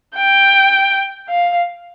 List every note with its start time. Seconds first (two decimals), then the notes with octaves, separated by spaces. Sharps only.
0.17 G5
1.29 F5